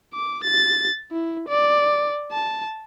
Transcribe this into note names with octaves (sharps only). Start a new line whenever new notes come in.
D6
A6
E4
D5
A5